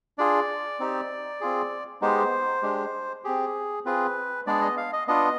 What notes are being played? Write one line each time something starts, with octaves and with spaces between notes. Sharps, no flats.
D4 F4 G#4 D5
C4 D#4 G4
C4 F4 G#4
G#3 B3 D#4 G4 C5
G#3 D4 G4
C4 G4 G#4
C4 F4 G#4 B4
G#3 B3 D4 G#4 D5
D#5
F5
D#5
B3 D4 F4 D#5